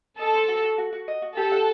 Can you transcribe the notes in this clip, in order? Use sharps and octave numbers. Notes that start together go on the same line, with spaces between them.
A4 D#5
C5
F#4
F#4
F#4
F#4
D#5
F#4
G4 A4
F#5